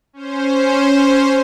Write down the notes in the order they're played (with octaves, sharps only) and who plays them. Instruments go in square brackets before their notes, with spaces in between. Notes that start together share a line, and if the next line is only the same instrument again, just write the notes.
[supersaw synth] C#4 C5